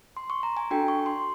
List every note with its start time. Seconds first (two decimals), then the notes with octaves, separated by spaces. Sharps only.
0.17 C6
0.30 C#6
0.43 A#5
0.57 G#5
0.71 D4 F#4 A4 G5
0.88 C#6
1.06 C6